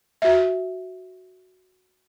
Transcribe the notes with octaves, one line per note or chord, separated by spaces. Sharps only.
F#4 E5